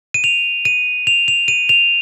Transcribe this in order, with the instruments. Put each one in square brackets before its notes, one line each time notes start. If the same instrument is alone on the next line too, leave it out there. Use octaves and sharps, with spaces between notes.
[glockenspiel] D#7
F7
D#7
F7
F7
D#7
F7